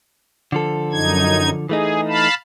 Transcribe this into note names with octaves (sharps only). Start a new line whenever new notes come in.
D3 F3 A4
F#2 D#4 G#6
E3 A3 D#4 G#4
F5 A5 B5